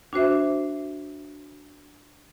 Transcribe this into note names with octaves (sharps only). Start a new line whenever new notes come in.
D4 F#4 C5 E5